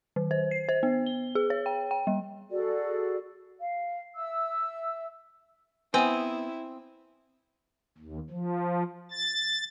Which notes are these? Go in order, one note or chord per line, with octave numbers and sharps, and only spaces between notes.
D#3
C5
C7
C5
B3
G7
G#4
C#5
G5
G5
G3
F#4 G#4 A4 D5
F5
E5 E6
B3 C4 E4 G#5 D#6
D#2
F3
A6